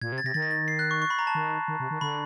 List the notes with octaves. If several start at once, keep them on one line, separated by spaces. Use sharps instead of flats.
A#2 G#6
C3
A6
C3 A#6
D#3 A6
A#6
A6
C7
F#6
C#6
C#6
B5
A#5
A5
D#3
D#3
C3
D#3
D3 B5